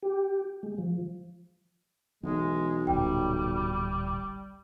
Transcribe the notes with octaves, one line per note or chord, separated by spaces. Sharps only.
G4
G#3
F3
B1 E3 G#3
D1 A1 A#2 G3 G5